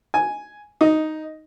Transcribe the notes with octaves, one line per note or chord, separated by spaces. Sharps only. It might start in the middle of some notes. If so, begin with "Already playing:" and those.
G#5
D#4